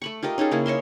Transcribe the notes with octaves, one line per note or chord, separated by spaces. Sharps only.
A3 B5 C#6
F4 G4 A#4 D#5
C#4 D#4 G#4 A4
C#3 A#3 E4 G#4
C#5 D#5 E5 C6